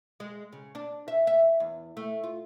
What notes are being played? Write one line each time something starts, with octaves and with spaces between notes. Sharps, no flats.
G#3
C#3
D4
E5
E5
E2
A3
F4